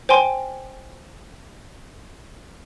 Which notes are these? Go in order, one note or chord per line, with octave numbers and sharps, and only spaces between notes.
C5 G5 G#5 C6